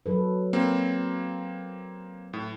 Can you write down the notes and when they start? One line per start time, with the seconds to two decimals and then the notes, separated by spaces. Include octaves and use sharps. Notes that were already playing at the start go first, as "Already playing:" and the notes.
0.06 F#3 A4 B4
0.53 A#3 C4
2.33 A2